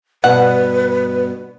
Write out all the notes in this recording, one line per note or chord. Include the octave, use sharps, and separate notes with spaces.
G2 B2 B4 F#5